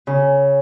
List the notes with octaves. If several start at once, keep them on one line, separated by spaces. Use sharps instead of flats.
C#3